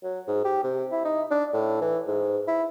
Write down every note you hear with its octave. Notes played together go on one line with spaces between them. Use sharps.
F#3
G#2
G4
C3
E4
D#4
D4
A2
E3
G#2
E4